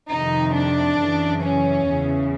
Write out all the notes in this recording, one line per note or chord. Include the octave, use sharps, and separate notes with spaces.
F2 C3 D#3 D#4
D4
F#2 C#3 E3
C#4
E2 C#3 E3